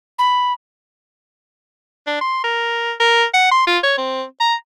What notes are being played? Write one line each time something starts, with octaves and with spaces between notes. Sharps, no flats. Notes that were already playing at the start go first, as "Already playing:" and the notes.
B5
D4
C6
A#4
A#4
F#5
C6
F4
C#5
C4
A#5